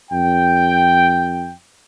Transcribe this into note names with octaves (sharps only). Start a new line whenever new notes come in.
F2 G5